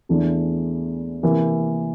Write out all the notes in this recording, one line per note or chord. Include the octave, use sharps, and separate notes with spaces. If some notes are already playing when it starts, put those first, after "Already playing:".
E2 E3 A3 D4
C3 E3 A#3